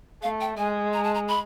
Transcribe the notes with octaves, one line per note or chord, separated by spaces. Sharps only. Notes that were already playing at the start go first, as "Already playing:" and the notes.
A3 F5
G5
G#3 G#5
A#5
A5
A#5
B5